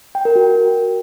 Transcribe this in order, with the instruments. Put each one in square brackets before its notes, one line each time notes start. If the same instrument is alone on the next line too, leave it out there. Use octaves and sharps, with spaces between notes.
[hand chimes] G5
A#4
F#4